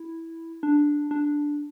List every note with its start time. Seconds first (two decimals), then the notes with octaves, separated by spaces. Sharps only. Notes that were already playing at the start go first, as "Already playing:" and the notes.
Already playing: E4
0.63 D4
1.11 D4